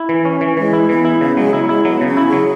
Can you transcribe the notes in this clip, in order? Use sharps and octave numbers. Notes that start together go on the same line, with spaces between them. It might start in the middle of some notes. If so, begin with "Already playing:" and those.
Already playing: E4
E3
C#4
E3
E3 G#3
E4
E3 B3
E4
C#3 B3
F#3 G#3
B3 E4
G#3 E4
F#3 B3
C#3
C#4
E4
G#4
F#3